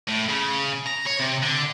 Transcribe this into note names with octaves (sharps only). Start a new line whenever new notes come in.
A2
C#3
A#5
C#5
C3
D3